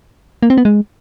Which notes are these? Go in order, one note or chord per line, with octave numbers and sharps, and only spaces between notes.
A#3
C4
B3
G#3